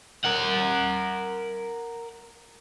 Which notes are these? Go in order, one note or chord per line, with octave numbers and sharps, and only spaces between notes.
A#4 F#5